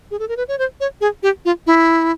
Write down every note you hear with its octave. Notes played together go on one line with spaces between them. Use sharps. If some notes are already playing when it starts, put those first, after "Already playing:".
G#4
A4
A#4
B4
C#5
C5
C#5
G#4
G4
F4
E4